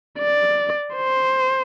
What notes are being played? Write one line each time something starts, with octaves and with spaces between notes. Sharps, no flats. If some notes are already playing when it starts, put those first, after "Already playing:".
D5
C5